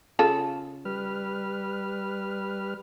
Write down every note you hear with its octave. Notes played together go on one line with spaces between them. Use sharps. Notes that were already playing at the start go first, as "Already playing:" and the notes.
C#3 F4 A4
G3 B4 F6